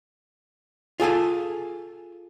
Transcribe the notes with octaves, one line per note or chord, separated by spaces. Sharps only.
F4 G#4 A4 G#5